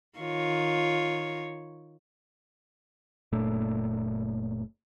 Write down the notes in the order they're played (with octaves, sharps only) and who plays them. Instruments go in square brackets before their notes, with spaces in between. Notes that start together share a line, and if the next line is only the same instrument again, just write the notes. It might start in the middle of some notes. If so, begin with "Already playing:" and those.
[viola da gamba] D#3 F4 C#5
[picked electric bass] F#1 A#2 A3 D4